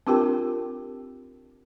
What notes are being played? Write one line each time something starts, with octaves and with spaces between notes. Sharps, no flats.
C4 D4 F4 G4 A#4 G5